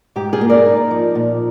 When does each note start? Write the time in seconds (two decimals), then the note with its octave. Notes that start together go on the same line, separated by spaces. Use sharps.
0.16 G#2 G4
0.33 F4 G#4
0.41 A#3
0.49 A#4 D5
0.66 D#4
0.91 F3
1.15 A#2